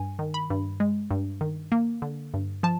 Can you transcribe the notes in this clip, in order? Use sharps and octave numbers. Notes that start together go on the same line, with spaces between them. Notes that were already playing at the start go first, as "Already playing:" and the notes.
Already playing: G2 G#5
D#3
B5
G2
G#3
G2
D#3
A#3
D3
G2
F3 A5